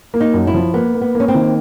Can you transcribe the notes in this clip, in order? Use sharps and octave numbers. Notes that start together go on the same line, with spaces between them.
A#3
D#4
F#2
E4
F3
A#3 B3
A#3
B3
A#3 C#4
C4
D#3